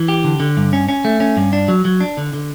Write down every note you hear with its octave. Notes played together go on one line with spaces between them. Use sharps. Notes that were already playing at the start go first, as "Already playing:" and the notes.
Already playing: E3
G4
D3
D3
G2
C#4
C#4
A3
C#4
G2
D4
F#3
F#3
D4
D3
D3